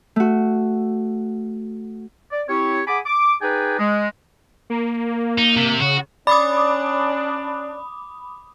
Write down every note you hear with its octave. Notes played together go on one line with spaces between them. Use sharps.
A3 F#4
D5
C4 E4 G4 C#5
G#4 F#5 G#5 B5 D6
D6
D#4 G#4 B4 D5 G5 G#5
G#3
A#3
D#4
C3
C#3 F#4
C#4 D4 D5 B5 D6 D#6